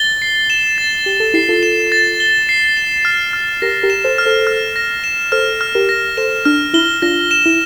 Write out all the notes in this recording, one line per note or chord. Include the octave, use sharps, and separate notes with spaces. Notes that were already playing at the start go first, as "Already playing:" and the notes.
Already playing: A6 G7
C7
E7
A6
G4 G7
A4
E4 G4 C7
F4 A4
E7
A6
G7
C7
E7
F6
F6
G4 A#4 A#6
G4 A#4
E7
A4 C5
F6
A4 C5
F6
A#6
E7
A4 C5 F6
F6
G4 A#4
A#6
A4 C5 E7
D4 F6
E4 G7
D4 F4 A#6
E7
E4